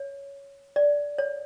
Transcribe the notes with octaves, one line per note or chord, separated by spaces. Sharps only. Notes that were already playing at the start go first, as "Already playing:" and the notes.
Already playing: C#5
D5
C#5